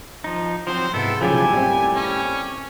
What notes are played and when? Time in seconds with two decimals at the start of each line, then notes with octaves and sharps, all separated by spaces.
0.24 F3 D#4
0.67 F3 F#3 C4 C5
0.94 G#2 C3 B3 E4 A4
1.21 B1 C#3 F3 A3 E4 G4 G#5
1.53 A#2 G3 C4
1.95 C#4